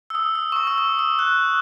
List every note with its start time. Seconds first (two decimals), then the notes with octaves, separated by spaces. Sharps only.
0.10 E6
0.15 D#6
0.35 E6
0.52 C#6
0.56 D#6
0.67 E6
0.78 D#6
0.99 E6
1.19 F#6